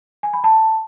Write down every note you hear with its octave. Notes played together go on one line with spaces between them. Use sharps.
G#5
B5
A5